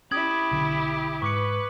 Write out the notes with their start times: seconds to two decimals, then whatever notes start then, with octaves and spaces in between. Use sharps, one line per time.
0.11 C#4 E4 G4 D#6 G#6 F#7
0.51 B1 D3
1.22 G#2 B4 C#6 D6 C#7